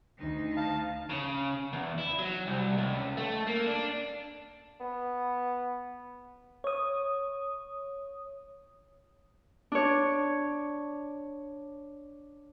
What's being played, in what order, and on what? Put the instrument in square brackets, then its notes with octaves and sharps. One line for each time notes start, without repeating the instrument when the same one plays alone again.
[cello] D2 D#4
[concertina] F5 A5
[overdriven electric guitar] C#3
E2
E4
F#3
C2
C#2
A3
A#3
D4
[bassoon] B3
[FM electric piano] C#5 D#6
[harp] D4 C#5